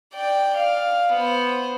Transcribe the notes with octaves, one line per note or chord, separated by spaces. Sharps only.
D5 G5
F5
B3 C5